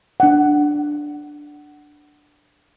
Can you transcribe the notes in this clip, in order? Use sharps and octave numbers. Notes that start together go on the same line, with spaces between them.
D4 F#5